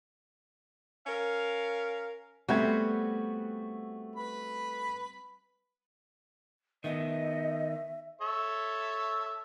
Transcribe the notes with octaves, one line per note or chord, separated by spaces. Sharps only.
C#4 A#4 F5
G3 A3 B3 C4 F#4 E5 G#6
B4 B5
D#3 B3 D#5 E5
A4 C#5 E5